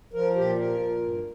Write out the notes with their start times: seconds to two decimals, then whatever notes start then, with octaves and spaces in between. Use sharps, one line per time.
0.14 F3 A#4
0.36 A#2 G4
0.58 F3 A#4
0.80 A#2
1.01 G2